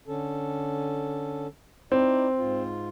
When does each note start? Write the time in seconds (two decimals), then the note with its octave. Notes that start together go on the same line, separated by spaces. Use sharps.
0.08 D3 C#4 A4
1.92 C4 D#4 E4 D5
2.38 G#2 F4